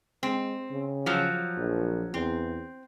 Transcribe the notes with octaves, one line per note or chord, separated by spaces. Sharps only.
G#3 C4
C#3
F3 F#3
A#1
E2 C4